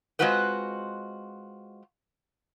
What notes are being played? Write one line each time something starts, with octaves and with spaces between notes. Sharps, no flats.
G#3 C4 F4 F#4 B4 C5